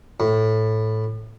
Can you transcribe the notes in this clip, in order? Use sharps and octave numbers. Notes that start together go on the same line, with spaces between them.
A2